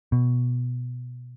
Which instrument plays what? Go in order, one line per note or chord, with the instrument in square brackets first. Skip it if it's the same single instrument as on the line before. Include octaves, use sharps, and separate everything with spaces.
[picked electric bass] B2